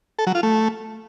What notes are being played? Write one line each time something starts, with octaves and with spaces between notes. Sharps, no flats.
A4
F#3
F4
A3